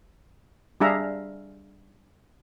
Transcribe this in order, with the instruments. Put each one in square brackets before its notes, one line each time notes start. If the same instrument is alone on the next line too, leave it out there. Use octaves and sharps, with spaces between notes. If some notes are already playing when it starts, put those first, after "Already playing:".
[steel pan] G3 D4 G#4 E5 F5 A#5